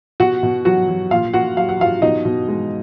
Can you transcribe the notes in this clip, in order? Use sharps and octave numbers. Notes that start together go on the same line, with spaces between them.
B2 F#4 F#5
B2
F#3 F#4 F#5
F#3
A#2 F4 F5
A#2 F#4 F#5
F#3 F5
F#5
F#3 F4 F5
B2 D#4 D#5
B2
G#3